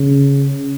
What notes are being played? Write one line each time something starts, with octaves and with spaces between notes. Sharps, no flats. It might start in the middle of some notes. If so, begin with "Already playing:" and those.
Already playing: C#3